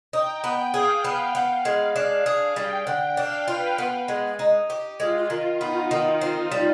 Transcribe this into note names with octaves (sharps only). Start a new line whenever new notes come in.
D#4 G5
B3
G#4 F5
B3
B3 F5
G#3
D4
G#4
G3 G5
D3
D4 F5
F4 B4
B3
G#3
D#4
G4
G#3 F4
D#3
B3 D#4
D#3
C4
G3